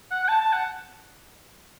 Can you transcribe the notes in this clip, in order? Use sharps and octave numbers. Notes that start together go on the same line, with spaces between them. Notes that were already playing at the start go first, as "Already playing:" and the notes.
F#5
F#5
A5
A5
F#5